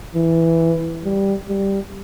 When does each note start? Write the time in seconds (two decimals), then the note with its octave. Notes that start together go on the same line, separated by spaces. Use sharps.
0.15 E3
1.04 G3
1.48 G3